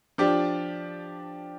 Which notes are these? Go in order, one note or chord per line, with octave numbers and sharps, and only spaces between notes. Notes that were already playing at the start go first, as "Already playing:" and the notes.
F3 D4 G4